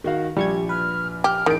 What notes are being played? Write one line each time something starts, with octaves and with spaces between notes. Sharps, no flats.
D#3 F#4 F5
A#1 G3 C#6 G#6
B4 F6
G4 F6
A1 D#3 G#4 D7